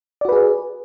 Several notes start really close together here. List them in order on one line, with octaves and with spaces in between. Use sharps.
D5 F#4 B4 G#4